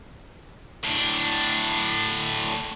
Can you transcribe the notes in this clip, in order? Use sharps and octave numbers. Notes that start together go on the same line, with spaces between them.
A2 D4